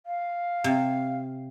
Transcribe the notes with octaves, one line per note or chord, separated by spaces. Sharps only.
F5
C3